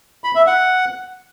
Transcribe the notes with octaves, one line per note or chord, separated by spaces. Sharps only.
B5
E5
F#5